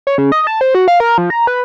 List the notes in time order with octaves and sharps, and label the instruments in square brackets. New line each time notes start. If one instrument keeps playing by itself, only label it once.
[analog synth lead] C#5
C#3
D#5
A5
C5
F#4
F5
A#4
F3
A#5
B4